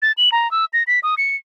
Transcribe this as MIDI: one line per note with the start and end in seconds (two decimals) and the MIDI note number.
0.02 0.12 93
0.17 0.30 102
0.32 0.50 82
0.51 0.65 88
0.73 0.83 94
0.87 1.00 95
1.03 1.15 87
1.18 1.36 97